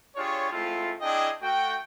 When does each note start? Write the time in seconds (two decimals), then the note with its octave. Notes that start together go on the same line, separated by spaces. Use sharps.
0.16 D4 F4 G4 G#4 C#5
0.51 G#3 A3 C4 E4 F4
1.01 C4 D4 E4 G#4 D#5 G5
1.42 A3 F#4 G5